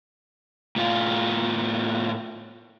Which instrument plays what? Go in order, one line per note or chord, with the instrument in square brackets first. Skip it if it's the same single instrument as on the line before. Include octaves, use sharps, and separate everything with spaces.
[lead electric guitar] A2 F4